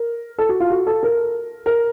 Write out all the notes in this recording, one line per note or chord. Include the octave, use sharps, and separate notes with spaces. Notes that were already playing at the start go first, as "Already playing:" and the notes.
Already playing: A#4
A4
F#4
F4
F#4
A4
A#4
A#4